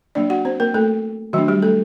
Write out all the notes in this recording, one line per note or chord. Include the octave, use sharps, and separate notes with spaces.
F#3 A#3 D4 D5
F#4 F#5
C4 C5
A#3 A#4
A3 A4
D#3 F#3 A3 D4 F#4
G3 G4
A3 A4